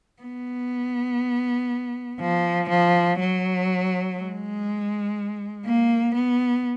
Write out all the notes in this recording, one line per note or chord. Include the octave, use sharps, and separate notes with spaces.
B3
F3
F3
F#3
G#3
A#3
B3